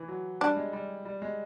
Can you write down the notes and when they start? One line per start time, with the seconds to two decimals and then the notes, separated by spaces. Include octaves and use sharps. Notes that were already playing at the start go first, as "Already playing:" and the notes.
Already playing: E3
0.08 F#3
0.41 G3 D4
0.57 G#3
0.73 G3
1.05 G3
1.22 G#3